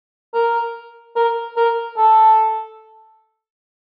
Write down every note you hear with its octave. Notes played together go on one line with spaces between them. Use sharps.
A#4
A#4
A#4
A4